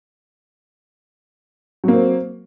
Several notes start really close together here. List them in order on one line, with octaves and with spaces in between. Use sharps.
F#3 A#3 C4